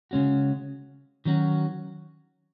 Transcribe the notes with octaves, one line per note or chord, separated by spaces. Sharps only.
C#3 G#3 C#4 F#4
D#3 F#3 C#4 F#4